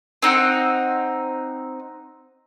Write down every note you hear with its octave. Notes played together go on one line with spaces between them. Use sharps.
C4 D#4 F#5 E6